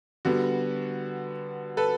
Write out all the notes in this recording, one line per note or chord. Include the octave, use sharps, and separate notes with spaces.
D3 G3 B3 F#4
A4 B4